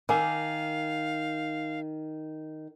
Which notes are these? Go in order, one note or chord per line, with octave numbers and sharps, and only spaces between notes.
D#3 A#4 F5 G#5 D6